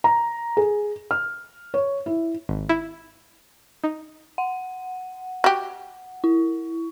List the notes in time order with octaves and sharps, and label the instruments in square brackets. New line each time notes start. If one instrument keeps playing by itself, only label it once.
[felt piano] A#5
G#4
F6
C#5
E4
[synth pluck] G#1
E4
D#4
[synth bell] F#5
[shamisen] F#4 G4
[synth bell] E4